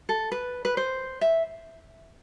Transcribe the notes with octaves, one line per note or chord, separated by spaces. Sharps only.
A4
B4
B4
C5
E5